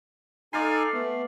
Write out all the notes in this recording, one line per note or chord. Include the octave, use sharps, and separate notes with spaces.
D#4 A4 D5 F5 G#5 C6
A3 B3